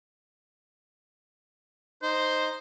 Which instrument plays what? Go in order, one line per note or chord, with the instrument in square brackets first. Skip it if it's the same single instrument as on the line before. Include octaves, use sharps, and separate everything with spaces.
[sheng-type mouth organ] D#4 [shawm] C5